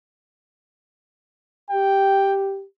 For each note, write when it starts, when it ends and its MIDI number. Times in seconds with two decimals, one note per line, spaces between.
1.71 2.64 67
1.71 2.35 79